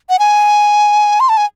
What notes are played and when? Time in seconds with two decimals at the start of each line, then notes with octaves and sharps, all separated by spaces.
0.09 F#5
0.19 G#5
1.20 C6
1.29 A5
1.37 G#5